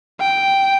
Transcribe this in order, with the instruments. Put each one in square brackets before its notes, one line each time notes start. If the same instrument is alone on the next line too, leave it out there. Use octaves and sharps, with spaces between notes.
[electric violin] G5